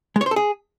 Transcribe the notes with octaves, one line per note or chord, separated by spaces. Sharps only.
G#3
C#5
C5
A4
G#4